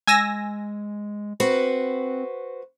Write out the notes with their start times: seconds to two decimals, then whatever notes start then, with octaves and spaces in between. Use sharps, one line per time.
0.07 G#3 G#5 E6 A#6
1.40 C4 F#4 B4 C5